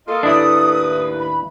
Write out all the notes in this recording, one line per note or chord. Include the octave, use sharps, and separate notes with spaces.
A#3 F4 A4 D#5
D#2 A2 D4 E4 B4 D5 D#6
B5